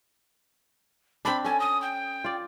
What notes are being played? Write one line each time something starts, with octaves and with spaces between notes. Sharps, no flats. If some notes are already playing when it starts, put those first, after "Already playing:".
C4 D4 B5
C#4 A4 G#5
D#6
G5
F4 D5